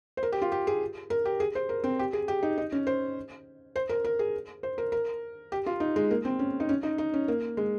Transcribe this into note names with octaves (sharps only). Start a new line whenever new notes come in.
C5
A#4
G4
F4
G4
G#4
A#4
G4
G#4
C5
A#4
C4
G4
G#4
G4
D#4
D#4
C#4
C5
C5
A#4
A#4
G#4
C5
A#4
A#4
G4
F4
D#4
G#3
A#3
C4
C#4
D#4
C#4
D#4
D#4
C#4
A#3
G#3